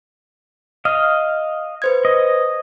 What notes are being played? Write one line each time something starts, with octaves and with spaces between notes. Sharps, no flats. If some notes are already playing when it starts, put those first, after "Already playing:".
D#5 F5 F6
B4 C5 G#6
D#5